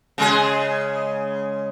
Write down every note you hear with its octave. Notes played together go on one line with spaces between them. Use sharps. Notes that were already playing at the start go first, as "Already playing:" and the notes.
C#3 G#3 G#4